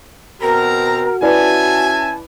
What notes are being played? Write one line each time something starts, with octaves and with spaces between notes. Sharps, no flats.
B2 C4 F#4 A#4 A#5
C#4 E4 B4 D5 E5 G#5 A5